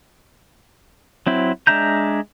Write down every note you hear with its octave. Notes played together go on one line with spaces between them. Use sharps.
F#3 C4 E4
G#3 D4 E5 A#5 G6